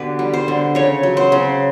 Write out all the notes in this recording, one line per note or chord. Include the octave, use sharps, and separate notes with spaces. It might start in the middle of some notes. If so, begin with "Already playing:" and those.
Already playing: B2 D3 G4 B4
G3
C5
D3
C#3 C#5
F#3
C5
C#3